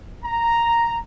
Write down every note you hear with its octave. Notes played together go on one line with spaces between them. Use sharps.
A#5